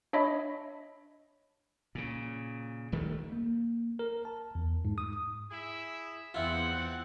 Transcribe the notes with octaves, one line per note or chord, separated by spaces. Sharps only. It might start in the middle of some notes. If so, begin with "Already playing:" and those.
D4 C#5 D#5 E5 B5
A#2 C#3
D#1 D2 D#3 A3
A#3
A#4
A5
E2
G#2
D#6
E4 G#4 E5
E2 F3 C4 E4 F4 F#5